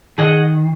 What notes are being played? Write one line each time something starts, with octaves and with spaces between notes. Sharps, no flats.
D#3 G#4 D#5 F#5